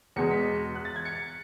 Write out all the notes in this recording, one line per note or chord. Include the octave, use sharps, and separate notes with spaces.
E2 B2 G#3 C#7
B6
F#6
A6
G#6
C#7